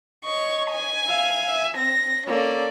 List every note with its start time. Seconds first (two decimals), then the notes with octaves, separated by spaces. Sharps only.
0.25 C#5 D#5 C#6
0.71 G#5
1.07 E5 F5
1.46 E5
1.77 C4 A#6
2.27 A#3 C#4 A4 D5